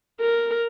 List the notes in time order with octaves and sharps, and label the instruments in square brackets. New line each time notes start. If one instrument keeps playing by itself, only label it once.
[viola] A#4